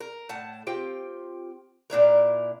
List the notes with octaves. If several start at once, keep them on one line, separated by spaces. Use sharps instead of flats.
A#4
A2 F#5 A5
C4 F4 G4 G5
A#2 D4 E4 A#4